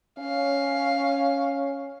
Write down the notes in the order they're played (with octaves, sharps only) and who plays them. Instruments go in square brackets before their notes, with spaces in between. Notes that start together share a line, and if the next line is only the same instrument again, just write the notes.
[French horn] C#4 [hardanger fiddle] F5